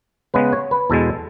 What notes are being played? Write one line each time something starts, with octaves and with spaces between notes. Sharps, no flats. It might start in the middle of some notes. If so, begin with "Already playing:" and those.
C#3 G#3 B3 B4
C#5
B4
E2 B2 G#3 A4